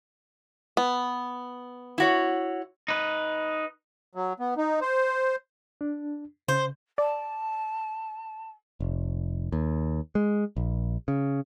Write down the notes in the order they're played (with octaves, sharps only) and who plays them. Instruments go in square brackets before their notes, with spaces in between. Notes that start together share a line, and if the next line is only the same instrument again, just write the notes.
[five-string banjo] B3
[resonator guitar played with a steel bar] E4 F#4 C#5
[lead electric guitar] D#4 B4
[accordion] F#3
B3
D#4
C5
[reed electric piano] D4
[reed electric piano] C#3 [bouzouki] C5
[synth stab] D5 [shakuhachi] A5
[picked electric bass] F1
D#2
G#3
A#1
C#3